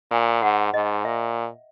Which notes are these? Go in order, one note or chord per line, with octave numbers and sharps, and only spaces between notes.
A#2 G#5
G#2 F#5
G#2 D#5
A#2 E5